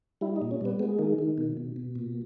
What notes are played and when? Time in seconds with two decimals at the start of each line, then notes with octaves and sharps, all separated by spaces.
0.21 G3 E4
0.36 D#4
0.42 A#2
0.51 C#4
0.61 G3 B3
0.79 G#3 B3
0.99 D#3 A#3
1.19 D#3
1.38 B2
1.57 B2
1.76 B2
1.95 A#2